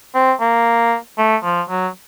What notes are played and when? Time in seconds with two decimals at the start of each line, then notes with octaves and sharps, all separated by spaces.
0.14 C4
0.41 A#3
1.18 A3
1.43 F3
1.69 F#3